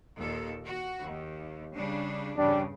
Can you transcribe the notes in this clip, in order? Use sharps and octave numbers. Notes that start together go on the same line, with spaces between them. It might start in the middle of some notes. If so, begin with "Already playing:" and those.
D#2 A#2 A4
F#4
D#2
C#3 G3 D4
E2 G2 C#3 G3 D4